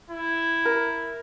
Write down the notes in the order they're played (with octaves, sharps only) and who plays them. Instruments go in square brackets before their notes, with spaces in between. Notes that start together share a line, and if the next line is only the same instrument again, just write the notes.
[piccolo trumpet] E4
[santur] A#4